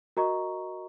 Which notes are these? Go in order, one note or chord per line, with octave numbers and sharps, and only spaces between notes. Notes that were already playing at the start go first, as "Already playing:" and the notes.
F#4 A#4 D#5 A#5 C#6